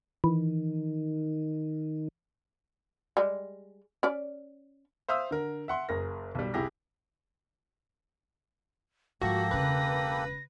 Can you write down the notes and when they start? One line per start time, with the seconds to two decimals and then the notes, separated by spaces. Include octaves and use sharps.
0.24 D#3 E3
3.17 G3 G#3
4.03 C#4 D5
5.08 C5 E5 F5 D#6 E6
5.31 D3 A#4
5.68 E5 F#5 C6
5.89 F#1 G#4 A#4 A#6
6.35 B1 G3
6.54 C2 E4 G4 G#4 A#6
9.21 G#2 F3 A#3 F#4 G4 A4 A#6
9.51 E1 C#3 B4